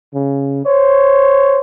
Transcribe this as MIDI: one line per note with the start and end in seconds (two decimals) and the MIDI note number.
0.13 0.60 49
0.65 1.61 72
0.65 1.61 73